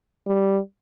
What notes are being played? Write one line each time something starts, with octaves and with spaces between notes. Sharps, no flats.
G3